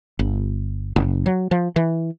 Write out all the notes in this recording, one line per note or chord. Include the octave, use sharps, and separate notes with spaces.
G1
F#1
F#3
F3
E3